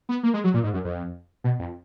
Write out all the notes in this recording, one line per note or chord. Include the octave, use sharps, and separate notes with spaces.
B3
A#3
G#3
F#3
A#2
G#2
F#2
F2
B2
F2